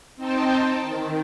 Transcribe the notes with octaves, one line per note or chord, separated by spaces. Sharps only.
C4 D#4 C5 G5 A5
D#3